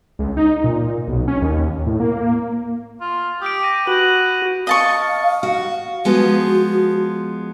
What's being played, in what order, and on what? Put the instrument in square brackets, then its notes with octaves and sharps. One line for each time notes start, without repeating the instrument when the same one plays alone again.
[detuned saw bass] C#2
D#4
A#2
B1
C#4
D#2
A2
A#3
[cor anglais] F4
[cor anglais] G4 [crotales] D#6 D7
[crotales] A#6 D7 D#7
[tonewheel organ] F#4 [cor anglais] B4 [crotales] G6 D#7 F#7
[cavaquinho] D#5 A5 C#6 [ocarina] F5
[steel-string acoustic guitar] F#4
[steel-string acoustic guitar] F3 G#3 B3 [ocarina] F#4